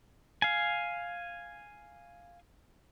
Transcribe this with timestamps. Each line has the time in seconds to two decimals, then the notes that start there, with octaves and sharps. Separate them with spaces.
0.42 F5 G#5